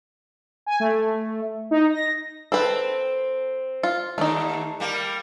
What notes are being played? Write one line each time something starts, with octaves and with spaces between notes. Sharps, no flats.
G#5
A3
D#4
A#6
C4 A4 B4
F4
D#2 A3 D#4
G3 A#3